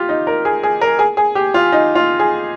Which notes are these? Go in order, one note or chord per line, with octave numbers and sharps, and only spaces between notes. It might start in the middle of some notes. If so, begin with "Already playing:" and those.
Already playing: F4 G4
D#4
A#4
G#4
G#4
A#4
G#4
G#4
G4
F4
D#4
F4
G#4